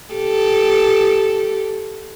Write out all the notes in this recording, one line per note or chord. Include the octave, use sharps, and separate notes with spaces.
G4 A4